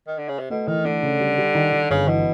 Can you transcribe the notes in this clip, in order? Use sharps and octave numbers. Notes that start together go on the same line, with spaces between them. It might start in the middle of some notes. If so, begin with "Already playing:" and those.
D#3
D3
C#3
C3
B2 A3
D#3 E3
D3 A3
C#3
G3
G3
D#3
D#3
G1 C#3
B2 E3